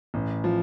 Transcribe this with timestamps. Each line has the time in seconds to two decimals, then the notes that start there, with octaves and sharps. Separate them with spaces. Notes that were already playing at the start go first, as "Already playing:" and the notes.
0.14 A1
0.44 F3